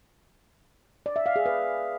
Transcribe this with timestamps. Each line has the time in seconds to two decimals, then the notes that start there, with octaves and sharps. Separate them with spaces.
1.06 D5
1.16 E5
1.26 F5
1.36 G#4
1.46 B4